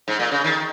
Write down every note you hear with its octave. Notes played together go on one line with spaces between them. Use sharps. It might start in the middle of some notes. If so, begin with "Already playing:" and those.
G#2
A#2
C#3
D#3